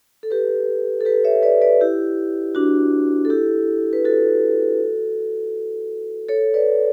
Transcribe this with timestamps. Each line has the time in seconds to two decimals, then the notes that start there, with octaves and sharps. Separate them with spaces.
0.23 A4
0.31 G4 B4
1.01 A4
1.05 G4 B4
1.24 C#5 E5
1.43 B4 D5
1.62 B4 D5
1.81 E4 G4
2.55 D4 F#4
3.25 A4
3.30 E4 G4
3.93 B4
4.04 F#4 A4
6.29 A4 C#5
6.54 B4 D5